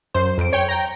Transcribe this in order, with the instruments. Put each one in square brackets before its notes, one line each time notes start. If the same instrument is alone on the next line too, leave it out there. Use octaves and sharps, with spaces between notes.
[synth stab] F#2 C5
F2 D7
C#5 G5
G5 A#5